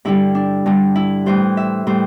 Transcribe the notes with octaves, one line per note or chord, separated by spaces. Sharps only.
G2 D3 G3 E4
D4
G2 D3 G3
E4
A2 E3 G3 C5
E5
A2 E3 G3 C5